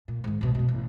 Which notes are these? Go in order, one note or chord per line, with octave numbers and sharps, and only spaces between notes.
A#2
G#2 D#3
B1 B2
F#2 B2
A1